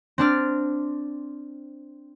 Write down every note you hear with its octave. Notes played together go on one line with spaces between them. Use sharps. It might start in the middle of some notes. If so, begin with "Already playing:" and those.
C4 D4 D5 F6